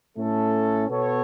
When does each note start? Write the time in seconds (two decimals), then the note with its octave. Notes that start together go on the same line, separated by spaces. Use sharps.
0.17 A2 A3 C#4 A4
0.89 B2 B3 A4 C#5